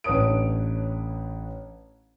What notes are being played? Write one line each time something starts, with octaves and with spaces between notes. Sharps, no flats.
A1 D4 B4 C#5 D#6 D7